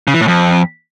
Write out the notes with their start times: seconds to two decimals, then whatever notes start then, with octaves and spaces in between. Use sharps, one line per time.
0.07 C#3
0.14 E3
0.21 A2
0.28 F2